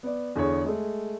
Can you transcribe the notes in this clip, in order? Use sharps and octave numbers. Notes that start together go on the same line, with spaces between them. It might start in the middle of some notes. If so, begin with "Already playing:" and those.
B3 D5
E2 D3 G#4 C#5 C#6
G#3 A3